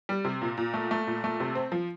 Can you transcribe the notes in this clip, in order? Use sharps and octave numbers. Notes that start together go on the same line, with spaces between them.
G3
C3
A#2
A#2
A3
A3
A#2
A3
C3
C4
F3